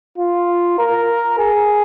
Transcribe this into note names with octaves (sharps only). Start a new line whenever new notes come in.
F4
A#4
G#4